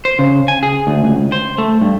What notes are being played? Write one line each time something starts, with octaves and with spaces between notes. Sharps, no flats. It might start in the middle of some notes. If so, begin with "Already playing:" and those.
C5
C#3
G#5
G#4
D2
C#2
C5
A3
G2